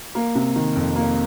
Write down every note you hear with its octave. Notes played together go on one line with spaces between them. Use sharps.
A#3
C3
D#3
F2
A#3